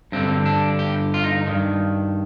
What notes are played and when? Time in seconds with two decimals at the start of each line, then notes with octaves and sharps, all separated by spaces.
0.12 G2 D3 C4
0.46 D4
0.79 G4
1.14 F4
1.24 D#4
1.46 G2 D#3